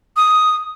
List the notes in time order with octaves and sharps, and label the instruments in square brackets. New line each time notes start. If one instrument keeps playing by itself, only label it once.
[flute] D#6